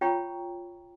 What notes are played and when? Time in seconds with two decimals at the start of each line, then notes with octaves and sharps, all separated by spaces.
0.01 F4 C#5 G5 A#5 B5 C#6